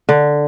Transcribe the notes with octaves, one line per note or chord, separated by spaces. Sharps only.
D3